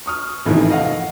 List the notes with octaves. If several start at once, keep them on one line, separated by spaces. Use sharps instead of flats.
C#6 D#6 F6
A1 F2 A2 C3 D#3 E3
D#5 F5 F#5